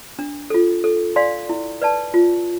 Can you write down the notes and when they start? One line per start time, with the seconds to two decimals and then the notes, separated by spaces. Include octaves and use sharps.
0.19 D4
0.50 F4 A4
0.84 A4
1.16 D5 F5 G#5 C6
1.49 E4
1.82 B4 D5 A5
2.14 F4